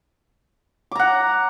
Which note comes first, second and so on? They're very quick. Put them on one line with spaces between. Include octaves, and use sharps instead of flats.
D6 A#5 F#5